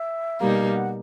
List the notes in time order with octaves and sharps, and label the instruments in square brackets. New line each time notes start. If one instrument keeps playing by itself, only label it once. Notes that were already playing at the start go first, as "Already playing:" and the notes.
Already playing: [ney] E5
[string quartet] B2 G3 A#3 D#4 [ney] F5
[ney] F5
F5
F#5